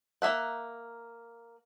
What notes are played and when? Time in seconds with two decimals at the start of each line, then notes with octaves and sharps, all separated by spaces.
0.22 A#3 E5 F#5